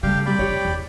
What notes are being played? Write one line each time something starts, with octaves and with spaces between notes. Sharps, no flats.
C#3 G3 A3 G4 F5 G5
F2 C3 G3 D5 G5 B5
F2 D3 G4 C#5
E2